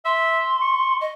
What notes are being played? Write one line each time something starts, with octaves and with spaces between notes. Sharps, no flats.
E5 C6
C#6
D#5